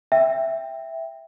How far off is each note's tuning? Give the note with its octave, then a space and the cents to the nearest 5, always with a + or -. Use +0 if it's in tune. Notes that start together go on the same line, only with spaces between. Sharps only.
E5 +0 G5 +10